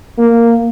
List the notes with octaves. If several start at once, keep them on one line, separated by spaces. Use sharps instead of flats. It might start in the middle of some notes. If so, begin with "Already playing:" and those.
A#3